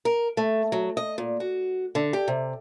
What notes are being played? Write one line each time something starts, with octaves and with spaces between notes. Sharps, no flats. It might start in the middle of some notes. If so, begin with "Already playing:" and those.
A#4
A3
F#3
D#5
A#2
F#4
D3
G4
C3